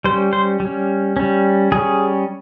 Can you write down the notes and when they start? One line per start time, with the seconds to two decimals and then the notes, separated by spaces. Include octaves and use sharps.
0.04 G3 C5
0.09 C#4
0.33 C5
0.60 G3
0.65 C#4
1.17 G3 C#4
1.72 G3 C#4 G#4